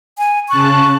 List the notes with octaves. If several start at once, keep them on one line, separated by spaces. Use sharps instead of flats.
G#5
C#3 A5 C#6 F#6